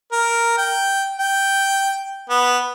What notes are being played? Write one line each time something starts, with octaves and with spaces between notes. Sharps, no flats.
A#4
G5
G5
B3